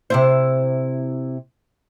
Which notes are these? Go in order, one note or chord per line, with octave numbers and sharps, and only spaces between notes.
C3 E4 C5